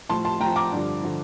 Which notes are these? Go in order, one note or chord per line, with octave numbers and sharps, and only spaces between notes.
A2 F3 A5 C6
A5 C6
A2 F3 G5 A#5
A#5 D6
G2 D3 F3
D3 F3